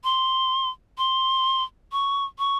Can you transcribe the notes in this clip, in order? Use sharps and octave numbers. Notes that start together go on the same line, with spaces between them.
C6
C6
C#6
C#6